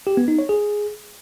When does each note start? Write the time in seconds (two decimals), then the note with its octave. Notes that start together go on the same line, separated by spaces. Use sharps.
0.07 G4
0.17 B3
0.28 D#4
0.39 C#5
0.49 G#4